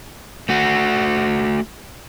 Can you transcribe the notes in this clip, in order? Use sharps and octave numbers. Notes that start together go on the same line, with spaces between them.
A3 F#4